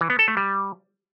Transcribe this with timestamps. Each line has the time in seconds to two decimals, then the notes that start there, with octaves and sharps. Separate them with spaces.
0.01 E3
0.10 B3
0.19 A4
0.28 A3
0.37 G3